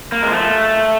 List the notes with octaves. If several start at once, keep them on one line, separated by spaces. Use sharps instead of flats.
A#3
F3 G#3
A3